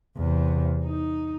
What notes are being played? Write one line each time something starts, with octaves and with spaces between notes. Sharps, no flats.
E2 C3
D#4